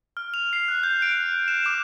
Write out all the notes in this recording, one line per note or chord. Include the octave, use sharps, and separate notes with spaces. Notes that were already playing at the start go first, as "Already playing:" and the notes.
F6
F7
C7
F#6
G6
D7
F#6
E7
D6